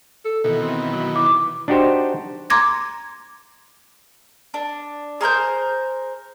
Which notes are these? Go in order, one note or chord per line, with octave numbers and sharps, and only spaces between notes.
A4
B2 D#3 E3 A4
C4
F#3
E4 D6
D4 D#4 F#4 G4 C5
A#5 C6 D6 G#6 A#6
D4
G#4 A#4 C5 G6